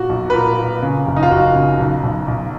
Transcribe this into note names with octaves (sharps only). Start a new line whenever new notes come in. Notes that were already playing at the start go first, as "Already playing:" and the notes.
Already playing: A#2 F#4
B1
B4
A#2 A#4
A#2
C#3
F#1
D#4
F4
F#1 F#4
C#3
B1
B1
B1